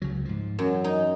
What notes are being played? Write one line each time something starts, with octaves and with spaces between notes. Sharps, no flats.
C#2 C#3 F#3
G#2 F3
F#2 E3 F#3
D#4